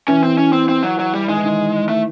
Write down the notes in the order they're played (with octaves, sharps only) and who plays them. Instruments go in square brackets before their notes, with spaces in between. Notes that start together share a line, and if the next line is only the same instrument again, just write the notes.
[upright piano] E3 [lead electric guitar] C#4
[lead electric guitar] C4
C#4
C4
C4
F#3
F#3
G3
[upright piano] D#3 [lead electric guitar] G#3
[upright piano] E3
D#3
[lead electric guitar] A3